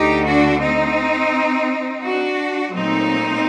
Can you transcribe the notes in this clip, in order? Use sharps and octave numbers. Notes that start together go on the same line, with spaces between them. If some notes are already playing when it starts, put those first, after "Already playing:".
Already playing: D2 D3 A3 D#4 G4
D4 F#4
C4 D#4
D4 F#4
A#2 F#3 A3 C4 D#4